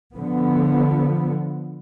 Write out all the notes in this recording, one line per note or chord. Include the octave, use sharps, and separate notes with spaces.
D3 F3 B3